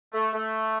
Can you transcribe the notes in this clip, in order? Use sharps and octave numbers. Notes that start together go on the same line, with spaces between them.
A3
A3